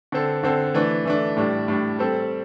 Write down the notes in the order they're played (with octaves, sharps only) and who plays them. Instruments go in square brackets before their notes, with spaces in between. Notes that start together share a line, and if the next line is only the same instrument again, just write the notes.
[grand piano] D3 C4 A4
D3 C4 A4
E3 A3 D4
E3 A3 D4
A2 G3 D4
A2 G3 D4
G3 C4 A4